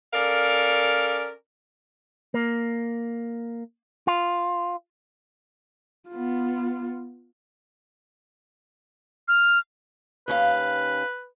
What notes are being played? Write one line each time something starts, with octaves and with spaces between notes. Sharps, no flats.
C#4 A4 A#4 D5 F5
A#3
F4
B3 F4
F6
D#2 C#4 B4 F5